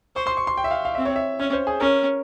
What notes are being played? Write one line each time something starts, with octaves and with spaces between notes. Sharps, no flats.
C5 C#6
C6
C#6
C6
G5
E5
F5
F5
C4 E5
C#5
E5
C#4 C#5
C5
G#4
C#4 A#4